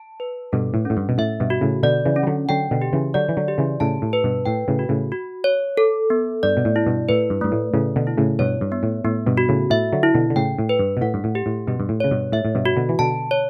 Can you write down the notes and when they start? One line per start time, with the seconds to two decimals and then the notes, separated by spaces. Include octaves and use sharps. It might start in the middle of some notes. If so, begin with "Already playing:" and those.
Already playing: A5
0.20 B4
0.52 G2 B2 A4
0.74 A2
0.85 A2 C#4
0.97 G2
1.09 B2
1.18 A2 E5
1.40 G2 B2
1.50 F#4
1.61 A2 C#3
1.83 B2 D3 D5
2.06 C#3 E3
2.16 C#4
2.23 G3
2.27 D3 F#3
2.49 D3 F#3 G5
2.71 B2 D3
2.82 G4
2.93 C#3 E3
3.14 D3 F#3 D5
3.29 E3
3.37 D3 F#3
3.48 G4
3.58 C#3 E3
3.80 A2 C#3 A5
4.02 A2
4.13 B4
4.24 G2 B2
4.46 A2 G5
4.68 A2 C#3
4.79 F#4
4.89 A2 C#3
5.12 F#4
5.44 C#5
5.77 A4
6.10 B3
6.43 G2 D5
6.57 B2
6.65 A2
6.76 E4
6.87 G2 B2
7.09 A2 B4
7.30 G2
7.41 G2 A3
7.52 A2
7.74 A2 C#3 A3
7.96 B2 D3
8.07 E4
8.18 A2 C#3
8.39 G2 B2 C#5
8.61 G2
8.72 B3
8.83 A2
9.05 A2 B3
9.26 G2 B2
9.37 F#4
9.49 A2 C#3
9.70 A2 E5
9.93 D3 F#3
10.03 E4
10.15 B2 D3
10.30 D3
10.36 A2 C#3 G5
10.59 A2
10.69 B4
10.79 G2
10.97 B2
11.01 A2 F#5
11.14 G2
11.24 A2
11.35 G4
11.46 A2
11.67 G2 B2 G4
11.80 G2
11.89 A2
12.00 C#3 C#5
12.11 G2 B2
12.32 A2 E5
12.45 A2
12.55 G2 B2
12.66 F#4
12.76 B2 D3
12.89 E3
12.99 B2 D3 A5
13.31 C#5